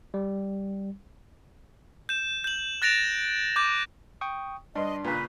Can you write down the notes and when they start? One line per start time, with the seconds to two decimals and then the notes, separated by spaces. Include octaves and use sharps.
0.14 G3
2.09 G6 E7
2.44 G6 F#7
2.82 F#6 A6 A#6 D7 E7 F7
3.56 D6 G6
4.21 G5 C#6 D#6
4.75 G2 D4 D#5 C6
5.04 A#2 C#3 B4